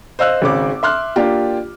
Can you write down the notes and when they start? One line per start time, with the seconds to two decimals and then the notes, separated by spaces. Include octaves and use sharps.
0.19 C5 D#5 F5 E6 F#6
0.42 G#1 C#3 D6
0.83 E5 C6 F6 F#6
1.16 A#3 D4 F4 G4